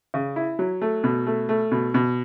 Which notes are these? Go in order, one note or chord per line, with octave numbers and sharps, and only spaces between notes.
C#3
E4
F#3
A3
B2
A3
A3
B2
B2